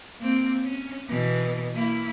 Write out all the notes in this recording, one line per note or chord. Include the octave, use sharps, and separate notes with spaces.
A#3 C4
C#4
B2 E3
A#3 E4